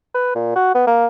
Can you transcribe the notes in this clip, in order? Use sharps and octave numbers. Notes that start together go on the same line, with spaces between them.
B4
A#2
F#4
B3
A#3